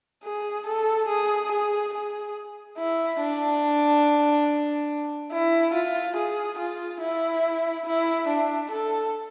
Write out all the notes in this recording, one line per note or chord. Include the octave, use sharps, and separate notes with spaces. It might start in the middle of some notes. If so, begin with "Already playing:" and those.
G#4
A4
G#4
G#4
G#4
E4
D4
E4
F4
G#4
F4
E4
E4
D4
A4